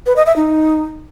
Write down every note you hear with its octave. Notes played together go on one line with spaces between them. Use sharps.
B4
D#5
E5
D#4